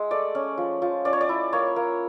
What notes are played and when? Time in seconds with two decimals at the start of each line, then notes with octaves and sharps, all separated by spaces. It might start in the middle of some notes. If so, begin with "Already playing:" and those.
Already playing: G#3 E5
0.11 A3 D5
0.35 C#4
0.58 F3
0.82 F3
1.05 C#4 D5
1.13 C#5
1.21 D5
1.29 E4
1.53 A#3 C#5
1.76 A#3